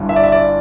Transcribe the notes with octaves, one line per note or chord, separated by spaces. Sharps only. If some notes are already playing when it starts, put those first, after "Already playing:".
Already playing: G1 G2 G3 E4
E5
D5
E5
D5